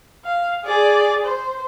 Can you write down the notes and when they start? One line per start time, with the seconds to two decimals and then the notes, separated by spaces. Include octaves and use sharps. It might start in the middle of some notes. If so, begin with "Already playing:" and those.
0.24 F5
0.65 G#4 D5
1.24 C5